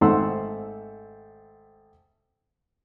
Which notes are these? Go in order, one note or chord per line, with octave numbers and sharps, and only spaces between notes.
G#1 A3 C4 F#5 C6 E6